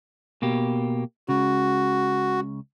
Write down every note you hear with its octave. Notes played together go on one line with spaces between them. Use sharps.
B2 A#3 G4
C#2 C#3 F#4